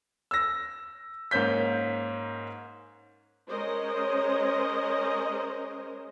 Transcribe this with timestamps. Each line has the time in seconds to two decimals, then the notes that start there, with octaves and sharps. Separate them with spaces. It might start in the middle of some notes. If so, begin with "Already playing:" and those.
0.31 E6 A#6
1.31 G#2 A#3 C#4 G6 B6
3.49 G#3 C#4 A#4 C5 C#5 D#5